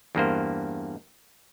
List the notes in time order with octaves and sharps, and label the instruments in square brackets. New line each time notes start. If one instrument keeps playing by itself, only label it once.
[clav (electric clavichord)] E2 G2 A#3 C5